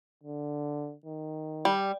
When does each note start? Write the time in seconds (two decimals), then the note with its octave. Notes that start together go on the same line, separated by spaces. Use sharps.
0.24 D3
1.05 D#3
1.65 G3